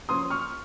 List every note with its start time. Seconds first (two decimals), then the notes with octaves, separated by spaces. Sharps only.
0.09 F3 A#3 C#4 C6 D#6
0.30 C#6 F6